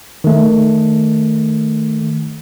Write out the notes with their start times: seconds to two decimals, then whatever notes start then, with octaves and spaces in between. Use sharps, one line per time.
0.24 D#3 A3